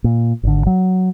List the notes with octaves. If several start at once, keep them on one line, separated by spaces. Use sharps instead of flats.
A#2
G#1 D3
F#3